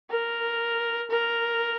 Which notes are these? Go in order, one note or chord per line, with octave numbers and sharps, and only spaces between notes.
A#4
A#4